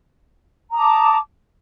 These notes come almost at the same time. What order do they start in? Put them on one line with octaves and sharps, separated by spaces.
A#5 D#6 A5 D6